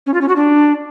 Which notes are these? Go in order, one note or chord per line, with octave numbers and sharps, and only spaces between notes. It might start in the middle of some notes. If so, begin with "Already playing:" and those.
C#4
F4
C#4
F#4
D4